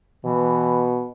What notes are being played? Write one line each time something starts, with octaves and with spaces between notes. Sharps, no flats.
B2 E3